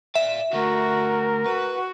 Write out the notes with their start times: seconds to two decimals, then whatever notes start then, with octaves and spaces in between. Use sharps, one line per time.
0.15 D5 E5 F5
0.53 D3 A3 F#4 A#4
1.46 F#4 B4